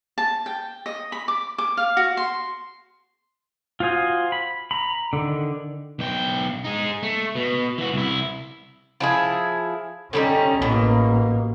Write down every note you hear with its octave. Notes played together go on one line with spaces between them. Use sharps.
A5
G5
D#5
B5
D6
D6
F5
F#4
C6
F4 F#4 C5 G#5 D#6
B5
A#5 B5
D3 D#3
B1 G5
D#4 G#4
A3
B2
E3 F#4
C2 E4
F3 E4 G#4
D3 G3 C#4 D#4
A1 B2 A#3